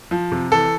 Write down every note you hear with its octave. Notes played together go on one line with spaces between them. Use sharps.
F3
C3
E3 A4